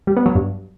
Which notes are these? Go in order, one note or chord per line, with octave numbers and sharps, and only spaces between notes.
G3
B3
F#3
G2